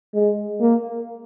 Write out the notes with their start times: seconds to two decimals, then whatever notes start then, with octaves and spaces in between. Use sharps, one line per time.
0.14 G#3
0.61 A#3